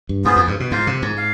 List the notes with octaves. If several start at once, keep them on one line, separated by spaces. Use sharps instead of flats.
G2
G#2 B3 F4 G#4 C5
F2
G2
B2
G#2 F4 C5 F5
C3
G#2
F5